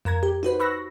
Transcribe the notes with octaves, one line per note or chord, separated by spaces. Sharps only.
F2 A#4 A#5 G#6
G4
D#4 F#4 B4 C5
B5 C#6 E6 F#6 A#6